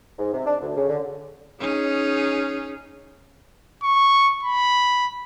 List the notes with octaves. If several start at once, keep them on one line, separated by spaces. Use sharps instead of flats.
G#2
C3
D4
D2
C#3
D3
C#4 D#4 G#4
C#6
B5